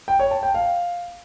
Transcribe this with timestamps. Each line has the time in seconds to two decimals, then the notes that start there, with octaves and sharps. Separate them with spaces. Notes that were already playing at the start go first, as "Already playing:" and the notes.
0.08 G5
0.20 C#5
0.31 A5
0.43 G5
0.55 F5